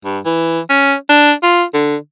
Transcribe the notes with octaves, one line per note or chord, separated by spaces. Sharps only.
G2
E3
C#4
D4
F4
D3